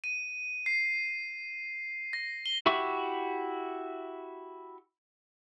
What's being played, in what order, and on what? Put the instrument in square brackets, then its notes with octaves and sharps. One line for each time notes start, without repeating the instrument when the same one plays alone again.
[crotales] D#7
C7
A#6
G7
[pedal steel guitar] E4 F#4 G4 E5 C#6